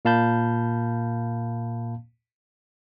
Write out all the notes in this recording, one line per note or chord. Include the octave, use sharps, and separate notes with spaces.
A#2 A#3 F5 A5 B5 G6